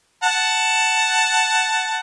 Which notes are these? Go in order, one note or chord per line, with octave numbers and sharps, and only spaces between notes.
F#5 A5